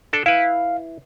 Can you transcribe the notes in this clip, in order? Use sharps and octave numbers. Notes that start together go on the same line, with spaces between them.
D4 A4
E4 B4 F5